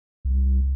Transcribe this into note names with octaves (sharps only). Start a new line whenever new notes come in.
C2